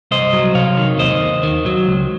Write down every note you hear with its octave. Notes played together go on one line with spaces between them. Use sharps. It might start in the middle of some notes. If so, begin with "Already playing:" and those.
C2 C5 D#5
F#3
C3 C#5 F5
D#3
D#2 C5 D#5
D#2
D#3
F#3
C#2